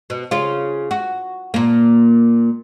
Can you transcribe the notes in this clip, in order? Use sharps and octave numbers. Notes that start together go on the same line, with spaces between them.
B2
C#3 F4
F#4
A#2 A#3